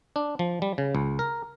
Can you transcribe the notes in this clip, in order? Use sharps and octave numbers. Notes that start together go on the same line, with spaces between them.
D4
F3
G3
C#3
C#2
A#4